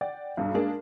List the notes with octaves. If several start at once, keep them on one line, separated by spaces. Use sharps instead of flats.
D5 F#5 G5
B1 G2
G#3 A#3 D4 G#4 A#4